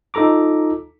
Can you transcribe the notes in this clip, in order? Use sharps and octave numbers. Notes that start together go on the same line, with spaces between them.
D#4 F4 A4 A#5 D6